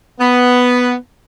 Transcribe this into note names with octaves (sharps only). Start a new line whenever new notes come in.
B3